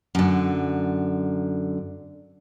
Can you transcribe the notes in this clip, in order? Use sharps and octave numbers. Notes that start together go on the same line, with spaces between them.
F#2 D3